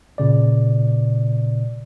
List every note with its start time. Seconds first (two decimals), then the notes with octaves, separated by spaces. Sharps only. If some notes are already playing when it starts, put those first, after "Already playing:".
0.18 A#2 C#3 D5